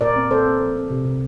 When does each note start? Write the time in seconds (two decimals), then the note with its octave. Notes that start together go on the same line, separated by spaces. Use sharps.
0.01 A#2 A#4 D5
0.16 C4
0.31 C4 A4 C5
0.45 C4
0.61 F3
0.76 C4
0.91 C3
1.05 C3